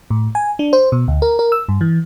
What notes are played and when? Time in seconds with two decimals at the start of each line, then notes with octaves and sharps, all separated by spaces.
0.10 A2
0.35 G#5
0.59 D4
0.73 C5
0.92 B2
1.08 D2
1.22 A#4
1.39 A#4
1.52 E6
1.69 G2
1.81 E3